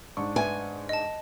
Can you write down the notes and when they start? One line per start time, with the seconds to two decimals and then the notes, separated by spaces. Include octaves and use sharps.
0.17 G#2 D4 C#6
0.36 B4 E5 G#5
0.89 D#5 A5